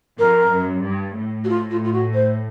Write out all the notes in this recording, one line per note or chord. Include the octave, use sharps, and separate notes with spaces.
F2 A#4
F#2
G2
A2
F#4
F4
F4
F4
F#4
C5